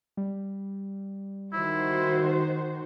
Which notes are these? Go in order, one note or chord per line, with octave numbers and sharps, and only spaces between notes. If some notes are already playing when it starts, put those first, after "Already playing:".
G3
D#3 E4 F#4 C5